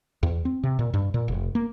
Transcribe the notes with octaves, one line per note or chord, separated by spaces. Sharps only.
E2
C4
C3
A#2
G2
A#2
F1
A#3